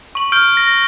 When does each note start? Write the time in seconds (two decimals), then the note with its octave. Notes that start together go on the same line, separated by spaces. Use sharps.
0.15 C#6 F#7
0.32 F6 G6 D7
0.57 A#6